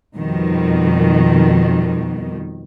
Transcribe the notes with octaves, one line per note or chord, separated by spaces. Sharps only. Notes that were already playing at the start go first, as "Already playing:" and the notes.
F2 B2 D#3 G3